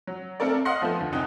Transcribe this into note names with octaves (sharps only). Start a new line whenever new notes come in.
F#3
A3 C4 A4 A#4 D5
D#5 F5 F#5 C6 A#6 C#7
F3 A3 B3 C5
D2
C2 F#2 D#4 G5 F#6